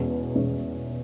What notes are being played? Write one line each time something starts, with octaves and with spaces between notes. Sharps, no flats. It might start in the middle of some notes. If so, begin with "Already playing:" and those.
Already playing: E2 B2 G#3 C#4
E2 B2 G#3 C#4